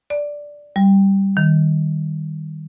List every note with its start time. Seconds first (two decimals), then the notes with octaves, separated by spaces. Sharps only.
0.10 D5
0.76 G3
1.37 D#3